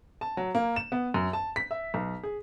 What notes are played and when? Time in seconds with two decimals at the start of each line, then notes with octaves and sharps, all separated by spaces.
0.21 A5
0.37 F#3
0.55 A#3
0.76 E7
0.92 B3
1.14 F#2
1.33 A5
1.56 B6
1.71 E5
1.94 B1
2.23 G#4